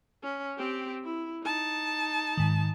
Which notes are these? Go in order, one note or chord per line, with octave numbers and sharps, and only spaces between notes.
C#4
C4 G4
E4
D#4 A5
G#2 D#3